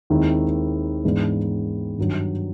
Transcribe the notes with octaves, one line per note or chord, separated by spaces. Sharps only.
D#2 D#3 G#3 C4 E4
G#2 E3 G#3 B3 D4
G2 D#3 F#3